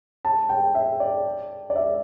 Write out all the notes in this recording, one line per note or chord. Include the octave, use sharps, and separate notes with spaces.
A5
G5
E5
D5
D5
E5